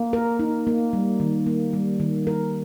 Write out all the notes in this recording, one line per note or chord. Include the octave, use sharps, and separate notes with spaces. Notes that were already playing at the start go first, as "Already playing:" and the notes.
Already playing: A#3
A#4
D#4
A#3
G3
D#3
A#3
G3
D#3
A#4